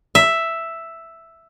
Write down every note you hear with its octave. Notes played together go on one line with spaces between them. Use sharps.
E5